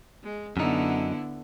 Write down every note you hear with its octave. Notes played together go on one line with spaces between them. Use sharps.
G#3
F#2 D3 B3 D#4 E4